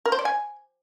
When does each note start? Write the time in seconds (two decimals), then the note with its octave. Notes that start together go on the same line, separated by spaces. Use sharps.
0.06 A#4
0.12 C5
0.19 D5
0.25 G#5